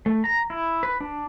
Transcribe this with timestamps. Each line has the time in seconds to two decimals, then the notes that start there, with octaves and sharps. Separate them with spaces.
0.06 A3
0.24 A#5
0.50 E4
0.83 B4
1.01 D4